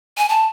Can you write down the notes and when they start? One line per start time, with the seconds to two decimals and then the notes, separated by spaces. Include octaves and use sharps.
0.18 G#5
0.29 A5